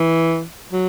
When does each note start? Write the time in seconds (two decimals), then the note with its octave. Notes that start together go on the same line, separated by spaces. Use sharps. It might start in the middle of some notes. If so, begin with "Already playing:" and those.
Already playing: E3
0.72 F#3